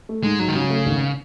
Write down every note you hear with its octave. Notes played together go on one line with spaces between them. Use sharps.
A3
G#2 G#3
G#2 F#3
D#3
C#3 F#3
A3
G#1